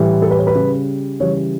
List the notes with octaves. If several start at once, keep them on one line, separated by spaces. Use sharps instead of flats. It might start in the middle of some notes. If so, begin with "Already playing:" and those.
Already playing: A2 E3 G3
A4
B4
C#5
B4
C#3 G3
C#3 E3 G3 C#5